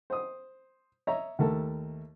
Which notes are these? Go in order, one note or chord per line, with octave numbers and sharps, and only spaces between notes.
C5 D#6
C#5 D#5 E5 A#5
D#2 A3 A4 A#4